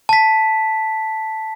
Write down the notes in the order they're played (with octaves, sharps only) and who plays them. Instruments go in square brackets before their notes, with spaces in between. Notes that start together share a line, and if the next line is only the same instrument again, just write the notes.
[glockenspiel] A5 B6